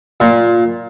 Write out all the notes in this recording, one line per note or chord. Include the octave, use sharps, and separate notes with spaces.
A#2